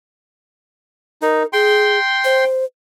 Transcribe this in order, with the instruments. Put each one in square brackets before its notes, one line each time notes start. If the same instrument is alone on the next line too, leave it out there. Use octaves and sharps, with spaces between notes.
[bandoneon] D#4 [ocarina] A#4
[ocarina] G#4 [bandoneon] G5 C6
[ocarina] C5